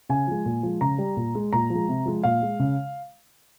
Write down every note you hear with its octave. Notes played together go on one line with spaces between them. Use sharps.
C#3 G#5
F3 G#3
A#2
F3 G#3
C#3 A#5
G3
A#2
G#3
A#2 A#5
F3 G#3
C3
F3 G#3
A#2 F5
G#3
C#3